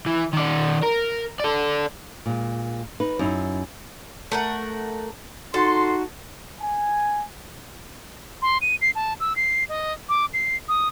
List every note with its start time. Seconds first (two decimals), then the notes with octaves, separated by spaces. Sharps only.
0.06 E3
0.33 D#3 D5
0.83 A#4
1.40 A4 D5
2.26 A#2 G#3
3.00 D#4 B4
3.19 F#2 D#4 E4
4.32 A3 A#4 F#5
5.54 D#4 F#4 A4 C6
6.59 G#5
8.42 C6
8.61 D#7
8.81 C7
8.95 A5
9.20 E6
9.36 C7
9.69 D#5
10.09 D6
10.33 C7
10.68 D#6